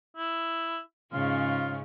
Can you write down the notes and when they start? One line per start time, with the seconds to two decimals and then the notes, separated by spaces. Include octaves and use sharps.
0.17 E4
1.13 G#2 C#3 C#4 F4